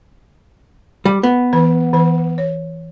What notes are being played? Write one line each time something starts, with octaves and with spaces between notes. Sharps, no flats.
G3
B3
E3 B4
E3 B4
C#5